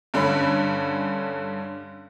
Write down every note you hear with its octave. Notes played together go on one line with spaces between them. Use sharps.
G2 D3 C#4 B5